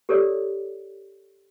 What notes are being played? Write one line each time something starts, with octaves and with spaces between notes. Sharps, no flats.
G4 A4 A#4 C#5 D5